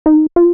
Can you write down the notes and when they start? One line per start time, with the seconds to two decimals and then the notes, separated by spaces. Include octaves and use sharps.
0.06 D#4
0.36 F4